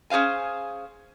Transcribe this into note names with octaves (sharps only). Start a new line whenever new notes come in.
C#4 G#4 C5 F5 G#5